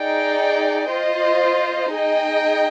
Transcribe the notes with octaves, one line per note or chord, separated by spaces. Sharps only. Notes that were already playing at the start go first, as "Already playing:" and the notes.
Already playing: D#4 G#4 D5 G5
F4 C5 D#5
D#4 G#4 D#5 G5